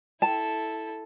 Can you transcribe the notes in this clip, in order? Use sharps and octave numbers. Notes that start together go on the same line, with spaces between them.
E4 A4 A5